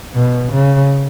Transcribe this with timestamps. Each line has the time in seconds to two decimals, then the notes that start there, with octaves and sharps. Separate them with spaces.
0.13 B2
0.53 C#3